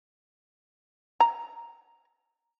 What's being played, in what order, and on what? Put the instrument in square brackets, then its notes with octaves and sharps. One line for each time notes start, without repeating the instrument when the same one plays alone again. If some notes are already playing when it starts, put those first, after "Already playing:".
[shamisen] A#5